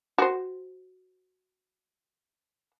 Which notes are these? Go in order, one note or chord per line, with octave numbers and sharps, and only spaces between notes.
F#4 C5